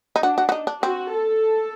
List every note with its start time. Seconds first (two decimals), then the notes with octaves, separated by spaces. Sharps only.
0.16 D#4
0.22 D4 F#4
0.38 F#4
0.49 F#4
0.52 D#4
0.67 D4
0.82 C4 F#4
1.12 A4